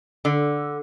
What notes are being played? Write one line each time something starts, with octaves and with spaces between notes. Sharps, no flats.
D3